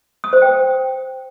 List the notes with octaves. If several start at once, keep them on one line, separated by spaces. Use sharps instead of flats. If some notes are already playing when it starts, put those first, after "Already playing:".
D#6
C5
G5